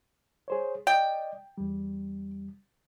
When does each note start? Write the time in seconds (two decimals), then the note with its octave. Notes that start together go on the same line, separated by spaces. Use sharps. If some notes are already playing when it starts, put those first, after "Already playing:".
0.48 G#4 C5 C#5
0.87 D5 D#5 G5
1.58 E2 G3